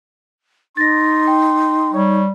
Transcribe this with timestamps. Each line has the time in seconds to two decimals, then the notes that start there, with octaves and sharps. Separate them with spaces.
0.77 D#4 C6 A6 A#6
1.27 G5
1.93 G3 C#5